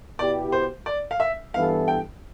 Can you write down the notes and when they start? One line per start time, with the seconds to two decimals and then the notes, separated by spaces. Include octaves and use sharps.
0.19 B2 B3 E4 G4 D5
0.52 C5
0.86 D5
1.11 F5
1.20 E5
1.54 G2 E3 B3 E4 A4 F5
1.88 G5